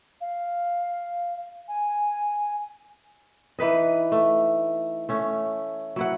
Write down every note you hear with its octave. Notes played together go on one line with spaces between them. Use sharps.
F5
G#5
E3 D#4 B4 D#5
A3
A3 C#4
F#3 E4 F#5